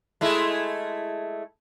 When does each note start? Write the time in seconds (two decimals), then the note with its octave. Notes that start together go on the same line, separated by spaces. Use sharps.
0.21 G#3 A3 E4